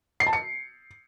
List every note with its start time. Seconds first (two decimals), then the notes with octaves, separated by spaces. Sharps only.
0.20 C7
0.27 A5
0.33 C#7